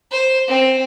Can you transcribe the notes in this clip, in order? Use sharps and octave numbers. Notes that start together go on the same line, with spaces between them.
C5
C4